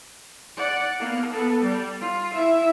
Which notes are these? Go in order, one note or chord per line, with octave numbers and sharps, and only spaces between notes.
D5 F#5
A#3 B3
B3 A4
G3
F4
E4 E5